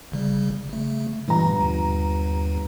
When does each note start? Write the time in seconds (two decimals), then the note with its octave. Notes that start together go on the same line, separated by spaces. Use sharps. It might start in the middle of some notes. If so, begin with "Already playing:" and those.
0.12 G1 C#3 G3
0.69 C#3 A3
1.28 G1 A#2 E3 A#5
1.60 D#2